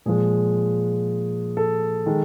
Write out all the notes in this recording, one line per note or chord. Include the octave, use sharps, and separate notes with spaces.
A#2 F3 G#3 G#4
A4
D#3 G#3